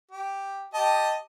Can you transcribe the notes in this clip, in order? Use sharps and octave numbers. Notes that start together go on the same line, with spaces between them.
G4
G4 D#5 A5